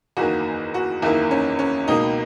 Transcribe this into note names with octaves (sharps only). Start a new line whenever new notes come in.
F#1 E2 D#3 A#3 F#4
F#4
F#1 E2 D#3 A#3 E4
C#4
C#4
C#2 B2 A#3 D#4